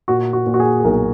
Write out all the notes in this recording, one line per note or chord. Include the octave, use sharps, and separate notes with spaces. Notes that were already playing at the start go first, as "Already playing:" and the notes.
A#2 F#4
F#4
A#2
F#4
G#4
G#4
B1 A#4